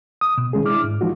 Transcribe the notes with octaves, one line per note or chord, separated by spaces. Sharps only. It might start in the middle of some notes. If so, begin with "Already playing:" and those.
D#6
B2
D#3 G#3 C#4 G#4
D4 E4 D6 F6
G#2
E3 F3 G#3 D#4 F4 F#4